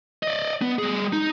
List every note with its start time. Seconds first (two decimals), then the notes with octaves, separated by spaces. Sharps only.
0.23 D5 D#5
0.62 B3
0.79 G3 G#4
1.13 D#4